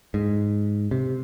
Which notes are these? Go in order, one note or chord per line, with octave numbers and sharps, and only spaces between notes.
G#2
C3